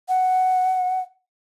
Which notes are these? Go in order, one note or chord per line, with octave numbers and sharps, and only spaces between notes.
F#5